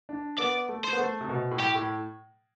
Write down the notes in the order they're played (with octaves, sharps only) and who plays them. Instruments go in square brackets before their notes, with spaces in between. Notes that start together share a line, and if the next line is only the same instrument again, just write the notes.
[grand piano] D4
[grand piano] B3 [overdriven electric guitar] D5
[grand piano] A3
[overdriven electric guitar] C5
[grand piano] B3
A3
C3
B2
A2
[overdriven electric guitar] G4
[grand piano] A2